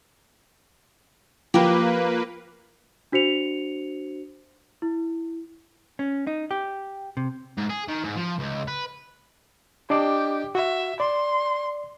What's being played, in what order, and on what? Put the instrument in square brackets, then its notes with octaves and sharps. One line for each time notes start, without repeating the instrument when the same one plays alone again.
[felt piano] F3 [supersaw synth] A#3 B4 [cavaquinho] G4 A#4
[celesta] D4 F#4 C5 C#7 F7
E4
[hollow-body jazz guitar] C#4
D#4
G4
C3
[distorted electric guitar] G#2
G#4
D#3
G#2
F3
C#2
B4
[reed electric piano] D4 D#5 D6 [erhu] G4
[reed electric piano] F#4 [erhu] E5
[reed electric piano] D5 [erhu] C6